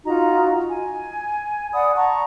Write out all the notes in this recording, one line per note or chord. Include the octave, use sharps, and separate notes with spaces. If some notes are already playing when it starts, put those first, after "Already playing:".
D#4 F4 F#4 A#5
G#5
D5 F#5 B5 D#6
A5 A#5 C#6